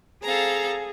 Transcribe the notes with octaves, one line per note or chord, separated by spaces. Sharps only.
C4 G#4 A4 F5 A#5